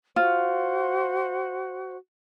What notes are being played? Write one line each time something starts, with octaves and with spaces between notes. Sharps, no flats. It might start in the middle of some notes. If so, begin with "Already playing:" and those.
F4 F#4 C5